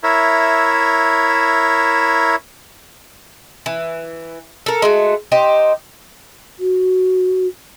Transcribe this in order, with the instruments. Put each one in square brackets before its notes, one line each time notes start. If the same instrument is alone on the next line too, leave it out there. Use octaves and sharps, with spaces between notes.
[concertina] E4 A#4 C#5 E5
[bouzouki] E3
A4 A#4
G#3 A3 F#4
D#4 G4 C5
[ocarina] F#4